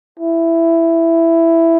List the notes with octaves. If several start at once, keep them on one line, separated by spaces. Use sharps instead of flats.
E4